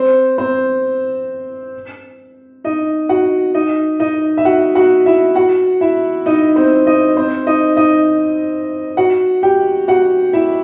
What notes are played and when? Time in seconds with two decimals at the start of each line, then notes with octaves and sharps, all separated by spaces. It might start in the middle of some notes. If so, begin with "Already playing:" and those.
Already playing: C4 C5
0.38 C4 C5
2.64 D#4 D#5
3.09 F#4 F#5
3.54 D#4 D#5
4.00 D#4 D#5
4.37 E5
4.45 F#4 F#5
4.75 F#4 F#5
5.06 E4 E5
5.36 F#4 F#5
5.81 E4 E5
6.26 D#4 D#5
6.56 C4 C5
6.87 D#4 D#5
7.17 C4 C5
7.47 D#4 D#5
7.77 D#4 D#5
8.97 F#4 F#5
9.43 G4 G5
9.88 F#4 F#5
10.33 E4 E5